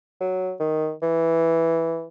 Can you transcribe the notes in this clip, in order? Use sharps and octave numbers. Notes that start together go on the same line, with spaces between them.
F#3
D#3
E3